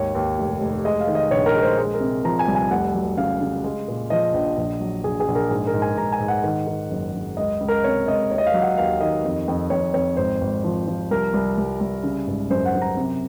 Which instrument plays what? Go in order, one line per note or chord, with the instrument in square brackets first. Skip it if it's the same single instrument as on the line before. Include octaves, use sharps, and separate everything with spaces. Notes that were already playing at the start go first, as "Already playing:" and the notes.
Already playing: [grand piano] G#1 D#2 C#5
D#2
F1
F1
G#3 D#5
F5
D#3
D#5
A#1 C#5
A#4
G#3
C5
G#3
A#4
C3
F3 A#5
G#5
C2
G#5
F1 F#5
F#3
C#3 F5
C#3
G#3
A#2
F3 D#5
A#1
A#1
F#3
A#1 G#4
G#4
A#1
A#4
G#2 G#4
A#4
G#2
G#5
G#2 A#5
G#5
G#2
F#5
D#3
D#3
F#1
F#1
C#2 D#5
C#2
A#4
C3 C#5
C#2 D#5
D#2 C#5
D#5
F5
F#3
F#5
D#2 F5
D#3 D#5
F2
F2
F2 C#5
F2 C#5
G#1 C5
G#1
F3
F3
C2 A#4
C2
C2
C2
C#3
G#1
F#2 C5
F#5
F#2
A#5
C3